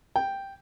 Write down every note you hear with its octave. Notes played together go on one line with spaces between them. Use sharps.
G5